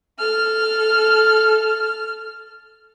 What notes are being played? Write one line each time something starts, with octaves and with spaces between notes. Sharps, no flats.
A4 F6